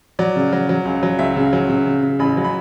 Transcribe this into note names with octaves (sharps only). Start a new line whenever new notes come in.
F#3 D5
C#3
F#3
F#3
C#2
F#3
C#2 E5
C#3
F#3
C#3
C#3
C#3
A1 B5
F#3
B5